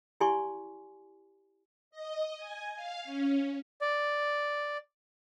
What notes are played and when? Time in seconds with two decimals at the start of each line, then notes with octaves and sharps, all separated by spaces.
0.20 E4 G4 D5 G#5 C6 C#6
1.91 D#5
2.37 G#5
2.75 F5
3.04 C#4
3.81 D5